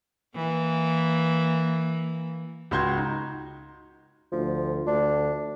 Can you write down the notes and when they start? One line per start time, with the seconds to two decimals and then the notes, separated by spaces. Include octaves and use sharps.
0.35 E3 A#3
2.71 C#2 F#4 C6 G6 G#6
2.97 D#4
4.32 D2 F3
4.87 D2 D4